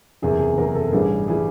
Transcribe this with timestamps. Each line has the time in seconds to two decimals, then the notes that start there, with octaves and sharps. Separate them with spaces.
0.22 F#1 E2 C3 G#4
0.40 G#4
0.58 F#1 E2 C3 A#4
0.75 A4
0.92 A1 G2 E3 G3 G#4
1.28 E3 G3 G#4